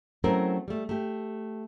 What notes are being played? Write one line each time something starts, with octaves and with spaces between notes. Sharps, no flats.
F#3 A3 C4 C#4 E4 A#4
G3 A3
A3 G4